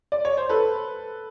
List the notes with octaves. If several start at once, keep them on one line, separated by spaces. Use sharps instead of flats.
D5
C#5
C5
A4 B4